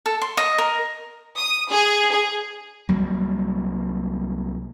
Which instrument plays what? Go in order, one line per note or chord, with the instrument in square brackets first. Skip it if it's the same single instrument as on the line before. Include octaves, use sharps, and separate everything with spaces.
[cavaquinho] A4
C6
D#5
A#4
[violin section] D#6
G#4
G#4
[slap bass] C2 F#3 G3 A#3